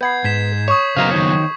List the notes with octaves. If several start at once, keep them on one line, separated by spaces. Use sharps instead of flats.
B3 F#5 G6 G#6 C7
G#2 G#6 B6 E7
C#5 C#6 D#6
C#3 F#3 B3 A#4 C5 D#5 F5 A#5
D#3 C#5